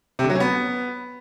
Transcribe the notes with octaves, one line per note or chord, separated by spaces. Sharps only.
C3
D3
F#3
C#4
B3